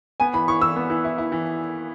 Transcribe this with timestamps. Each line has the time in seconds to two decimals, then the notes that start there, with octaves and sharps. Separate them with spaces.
0.20 B3 G#5
0.34 E3 B5
0.48 E3 C#6
0.61 E3 E6
0.76 B3
0.90 E3
1.05 E4
1.18 E4
1.32 E3